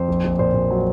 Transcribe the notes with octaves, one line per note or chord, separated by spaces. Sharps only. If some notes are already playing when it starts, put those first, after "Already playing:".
Already playing: F2 C5
A#1
A#1
A#2 C5
A#2
F#3